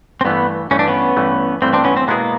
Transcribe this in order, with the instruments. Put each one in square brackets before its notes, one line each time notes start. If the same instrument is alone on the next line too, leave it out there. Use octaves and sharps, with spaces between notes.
[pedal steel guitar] C4
[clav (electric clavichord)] G2 E3 A3 [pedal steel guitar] B3
[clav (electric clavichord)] G2 E3 A3 [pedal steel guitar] C#4
[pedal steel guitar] D4
B3 C#4
[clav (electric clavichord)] G2 E3 A3
[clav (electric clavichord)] G2 E3 A3 [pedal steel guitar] C4
[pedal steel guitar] C4 D4
B3 C#4
C4
[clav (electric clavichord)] B2 G#3 B3 E4 G#4 [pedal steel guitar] A#3